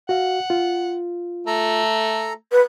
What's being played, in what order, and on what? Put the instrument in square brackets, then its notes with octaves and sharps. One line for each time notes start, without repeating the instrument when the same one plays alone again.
[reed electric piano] F#4 F5 [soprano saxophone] F#5
[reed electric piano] F4
[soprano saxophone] A3 [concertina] A4 A#5
[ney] B4